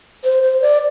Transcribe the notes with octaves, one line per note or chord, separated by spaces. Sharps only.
C5
C5
D5